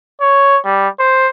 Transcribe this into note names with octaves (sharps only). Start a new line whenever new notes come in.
C#5
G3
C5